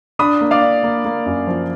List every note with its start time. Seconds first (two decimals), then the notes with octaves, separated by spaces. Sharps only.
0.19 D4 B5 D#6
0.41 A#3
0.51 D5 F5
0.62 D4
0.83 A#3
1.05 A#3
1.26 F#2
1.47 F3